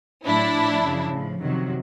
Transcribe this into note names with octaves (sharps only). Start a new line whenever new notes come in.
A2 F#3 D4 E4
A2 F3
F#2 C#3 F3
A2 F3
F2 C3 D#3 F#3